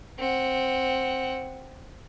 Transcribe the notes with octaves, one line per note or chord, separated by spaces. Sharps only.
C4 F#5